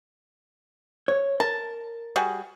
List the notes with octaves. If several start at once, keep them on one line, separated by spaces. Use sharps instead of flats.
C#5
A#4 A5
G3 F#4 G#4